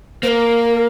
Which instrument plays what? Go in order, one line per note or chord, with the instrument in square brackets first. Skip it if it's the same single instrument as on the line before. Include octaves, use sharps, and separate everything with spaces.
[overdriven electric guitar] A#3 [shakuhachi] A#4 C5